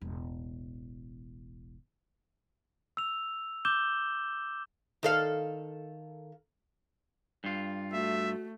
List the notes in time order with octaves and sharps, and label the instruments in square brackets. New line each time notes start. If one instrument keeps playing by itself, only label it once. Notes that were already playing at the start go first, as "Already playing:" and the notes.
[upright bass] E1 A1
[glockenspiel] E6 F7
D6 E6 G6 E7 G7
[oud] D#3 A4 F5
[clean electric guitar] G2 F4
[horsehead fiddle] A3 [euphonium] F#4 [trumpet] E5